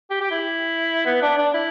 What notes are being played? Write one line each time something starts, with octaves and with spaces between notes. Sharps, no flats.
G4
G4
E4
B3
D4
D4
E4